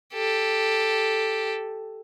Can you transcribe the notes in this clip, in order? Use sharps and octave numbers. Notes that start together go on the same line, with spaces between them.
G4 A4